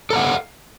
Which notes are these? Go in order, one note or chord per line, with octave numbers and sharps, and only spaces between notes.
A4 F5 F#5 A#5